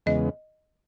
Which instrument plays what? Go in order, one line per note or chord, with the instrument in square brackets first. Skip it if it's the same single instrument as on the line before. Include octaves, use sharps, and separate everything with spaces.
[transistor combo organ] E2 C#3 G#3 B3 [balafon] D#5